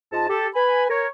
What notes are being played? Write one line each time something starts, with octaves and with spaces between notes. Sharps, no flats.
G#2 F4 D#5 A5
G4 A4
B4 G#5 B5
A#4 C#5